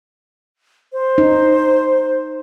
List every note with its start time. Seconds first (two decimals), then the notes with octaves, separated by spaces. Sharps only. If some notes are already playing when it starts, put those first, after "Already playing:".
0.93 C5
1.18 D#4